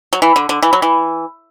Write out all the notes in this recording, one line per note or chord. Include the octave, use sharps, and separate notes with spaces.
F#3
E3
D3
D3
E3
F#3
E3